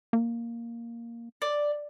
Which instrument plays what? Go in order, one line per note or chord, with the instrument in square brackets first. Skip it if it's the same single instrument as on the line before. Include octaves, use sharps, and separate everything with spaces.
[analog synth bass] A#3
[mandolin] D5